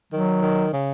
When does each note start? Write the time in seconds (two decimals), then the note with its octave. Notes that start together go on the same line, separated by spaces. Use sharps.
0.12 D#3 F#3
0.42 D#3
0.73 C#3